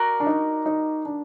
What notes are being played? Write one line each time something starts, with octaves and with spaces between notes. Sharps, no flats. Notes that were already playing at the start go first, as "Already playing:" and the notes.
Already playing: F#4 A#4 D5
D4
D#4
D#4
D4